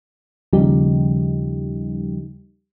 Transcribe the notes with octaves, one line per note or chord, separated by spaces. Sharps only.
D#2 C#3 F3 G3 D#4 G4